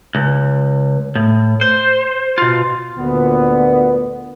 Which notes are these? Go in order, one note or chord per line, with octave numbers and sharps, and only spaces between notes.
C#2
A2
C5
B2 F4
D2 A#2 D3 B3